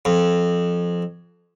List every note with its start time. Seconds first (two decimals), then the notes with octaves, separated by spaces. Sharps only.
0.05 F2